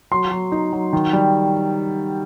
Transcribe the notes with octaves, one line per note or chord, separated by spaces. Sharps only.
F#3 C6
F#3
D#4
F#3
D#3
G3